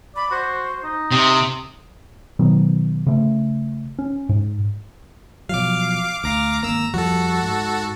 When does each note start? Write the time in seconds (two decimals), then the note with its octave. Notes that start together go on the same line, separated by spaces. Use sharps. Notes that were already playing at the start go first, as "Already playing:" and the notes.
0.16 D5 B5
0.31 F#4 C5
0.84 D#4
1.11 C3 D#6
2.39 B2 D#3 F#3 B3
3.07 C#3 A3
3.99 C#4
4.29 G#2
5.49 B2 F3 F#3 F5 D6
6.24 D2 F5 A#5 D6
6.63 G#1 D#2 A#3 A#5 E6
6.94 F2 F3 G3 F#4 A4
7.43 G#2